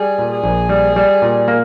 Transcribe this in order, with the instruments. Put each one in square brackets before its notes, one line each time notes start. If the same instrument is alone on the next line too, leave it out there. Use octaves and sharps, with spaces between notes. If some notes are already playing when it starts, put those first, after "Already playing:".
Already playing: [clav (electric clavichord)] G3 [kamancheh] G#4
[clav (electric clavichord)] A#2
[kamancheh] G#4
[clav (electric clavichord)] A#1
G3
G3
A#2
A#3